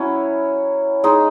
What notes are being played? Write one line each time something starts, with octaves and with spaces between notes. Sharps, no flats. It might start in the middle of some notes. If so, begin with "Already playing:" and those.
Already playing: F#3 C#4 E4
G#3 D#4